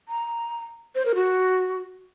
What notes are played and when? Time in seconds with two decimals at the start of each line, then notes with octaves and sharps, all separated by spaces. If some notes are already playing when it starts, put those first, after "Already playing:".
0.09 A#5
0.95 C5
1.06 A#4
1.15 F#4